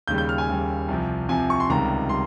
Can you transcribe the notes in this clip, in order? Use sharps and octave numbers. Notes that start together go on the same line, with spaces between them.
D#2 C#3 G3 G6
G6
F6
G#5
D#2 C#3 G3
C2 C3 F3
C2 C3 F3 G#5
C#6
C6
C#2 C3 D#3 G3 A#5
G3 C6